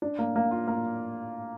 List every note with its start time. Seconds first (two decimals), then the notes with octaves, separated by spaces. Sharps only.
0.02 D4
0.19 A#3
0.36 A#3
0.51 F4
0.68 A#3